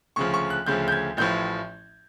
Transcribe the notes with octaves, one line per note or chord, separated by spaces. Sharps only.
D2 C#3 F3 C#6
C#6
F#6
D2 C#3 F3 G6
G6
G#6
A1 A2 F3 G6